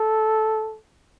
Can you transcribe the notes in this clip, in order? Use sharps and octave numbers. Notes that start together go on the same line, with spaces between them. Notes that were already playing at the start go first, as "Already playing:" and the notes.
Already playing: A4